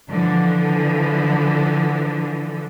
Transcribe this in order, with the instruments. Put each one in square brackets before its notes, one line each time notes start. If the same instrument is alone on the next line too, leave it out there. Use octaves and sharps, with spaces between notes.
[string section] D3 E3 F3